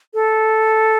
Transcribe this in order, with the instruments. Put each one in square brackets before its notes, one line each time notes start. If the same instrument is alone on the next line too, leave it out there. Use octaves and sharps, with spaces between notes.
[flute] A4